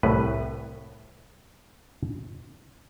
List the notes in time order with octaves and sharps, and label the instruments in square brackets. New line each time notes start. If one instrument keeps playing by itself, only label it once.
[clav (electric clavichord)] C2 A2 B4